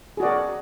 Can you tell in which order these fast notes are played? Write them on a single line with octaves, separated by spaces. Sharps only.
G#4 F#4 D5 A#4